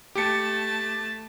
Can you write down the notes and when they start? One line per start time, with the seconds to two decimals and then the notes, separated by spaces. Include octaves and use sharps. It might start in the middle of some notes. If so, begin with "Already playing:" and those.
0.15 A3 G4 A5 C#7